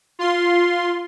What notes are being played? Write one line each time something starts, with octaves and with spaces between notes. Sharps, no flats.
F4 C6